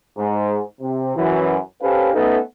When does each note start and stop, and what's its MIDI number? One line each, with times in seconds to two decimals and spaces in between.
0.17 0.58 44
0.81 1.13 48
1.16 1.57 42
1.16 1.57 52
1.81 2.12 61
1.81 2.12 67
1.81 2.12 69
1.81 2.12 71
1.81 2.12 72
1.81 2.12 77
2.14 2.38 57
2.14 2.38 59
2.14 2.38 61
2.14 2.38 63
2.14 2.38 69
2.14 2.38 71